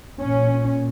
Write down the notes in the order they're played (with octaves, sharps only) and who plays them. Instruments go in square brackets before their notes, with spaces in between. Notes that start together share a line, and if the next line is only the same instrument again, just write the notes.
[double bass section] A#2 C#4